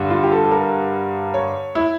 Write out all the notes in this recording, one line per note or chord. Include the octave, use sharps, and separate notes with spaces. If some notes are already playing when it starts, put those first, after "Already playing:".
Already playing: G2 D3
F4
G4
A4
A4
A#4
C#5
E4